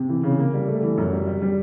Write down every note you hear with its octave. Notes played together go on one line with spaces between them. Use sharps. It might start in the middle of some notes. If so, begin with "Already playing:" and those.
Already playing: C3
E3
C#3
A#3
G3
A3
E3
F#2
G3
G3
G3